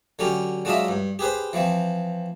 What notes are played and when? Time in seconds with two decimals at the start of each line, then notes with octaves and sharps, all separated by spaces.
0.19 D3 F#3 C#4 G4
0.65 F#3 G#3 D4 F4 D#5 E5
0.88 G2
1.19 G4 G#4 B4 C5
1.53 E3 F3 C4